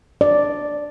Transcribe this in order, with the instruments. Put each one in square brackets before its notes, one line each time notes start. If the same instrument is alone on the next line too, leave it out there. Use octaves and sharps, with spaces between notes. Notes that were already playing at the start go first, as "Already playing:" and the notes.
[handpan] D5